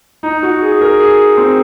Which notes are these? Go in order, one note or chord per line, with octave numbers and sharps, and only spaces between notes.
D#4
F#4
G#4
G#4
A#4
G#4
C4